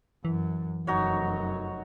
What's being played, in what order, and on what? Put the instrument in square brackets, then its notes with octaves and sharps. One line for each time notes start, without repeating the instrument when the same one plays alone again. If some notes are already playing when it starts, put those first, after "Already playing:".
[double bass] F#2 [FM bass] E3
[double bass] F1 F#2 [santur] D#4 F#4 C#5